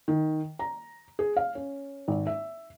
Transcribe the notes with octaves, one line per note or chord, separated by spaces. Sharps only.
D#3
A#5
G#4
F5
C#4
G#1
E5